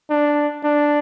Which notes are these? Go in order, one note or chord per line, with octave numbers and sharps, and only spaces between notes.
D4
D4